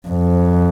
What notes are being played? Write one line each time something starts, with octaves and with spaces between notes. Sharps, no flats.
F2